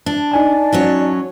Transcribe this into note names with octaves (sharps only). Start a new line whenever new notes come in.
D4
D#4 D5 G#5 A5
F#3 C#4 C#5